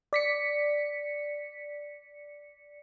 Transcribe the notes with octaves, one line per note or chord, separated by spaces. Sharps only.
D5 B6 C#7